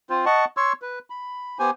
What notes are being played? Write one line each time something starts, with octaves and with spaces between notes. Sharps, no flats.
C4 F4 C5
D#5 F#5 A5 C#6
C#5 C6 C#6 E6
B4
B5
B3 G4 C5 G#5